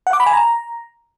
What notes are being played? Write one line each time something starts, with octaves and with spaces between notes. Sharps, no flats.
F#5
D6
B5
G#5
A#5